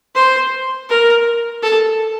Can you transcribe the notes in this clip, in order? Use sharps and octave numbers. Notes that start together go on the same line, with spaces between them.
C5
A#4
A4